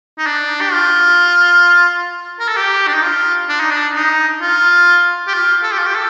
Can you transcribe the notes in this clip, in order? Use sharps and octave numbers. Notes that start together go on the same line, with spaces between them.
D#4
D4
G4
F4
A#4
A4
G4
D4
D#4
F4
D4
D#4
D4
D#4
F4
G4
F4
A4
G4
F4
G4
A4